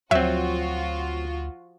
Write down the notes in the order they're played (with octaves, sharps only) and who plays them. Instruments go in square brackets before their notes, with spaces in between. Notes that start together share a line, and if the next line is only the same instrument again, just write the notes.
[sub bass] D2 [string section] F3 F4 F#4 [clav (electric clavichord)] F#3 C4 [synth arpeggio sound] E5